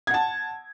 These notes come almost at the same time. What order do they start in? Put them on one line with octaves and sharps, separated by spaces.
G#6 F#5 A5